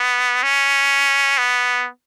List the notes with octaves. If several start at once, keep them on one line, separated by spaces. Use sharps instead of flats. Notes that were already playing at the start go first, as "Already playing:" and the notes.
Already playing: B3
C#4
B3